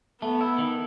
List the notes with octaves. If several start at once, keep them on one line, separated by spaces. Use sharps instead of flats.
A3 B3
E4
D#3